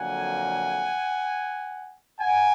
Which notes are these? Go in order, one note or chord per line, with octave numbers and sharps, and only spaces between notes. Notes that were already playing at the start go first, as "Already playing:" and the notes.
Already playing: F2 D3 F#3 A#3 F#5 G#5
F#5 G#5